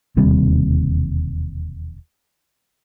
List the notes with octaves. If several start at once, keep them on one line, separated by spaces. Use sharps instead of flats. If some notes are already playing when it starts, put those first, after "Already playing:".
E1 D#2 C3 G3